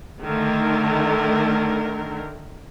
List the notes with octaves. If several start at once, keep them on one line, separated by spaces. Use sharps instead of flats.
D3 D#3 A3 A#4